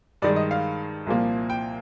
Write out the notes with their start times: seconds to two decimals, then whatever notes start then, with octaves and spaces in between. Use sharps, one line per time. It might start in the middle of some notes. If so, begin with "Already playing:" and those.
0.22 G2 D#3 G#3 D5
0.36 D#5
0.51 F5
1.07 C2 A#2 F3 A#3
1.50 G5